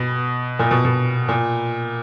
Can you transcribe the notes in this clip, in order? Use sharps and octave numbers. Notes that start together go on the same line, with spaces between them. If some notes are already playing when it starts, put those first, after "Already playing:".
Already playing: B2
A#2
B2
B2
A#2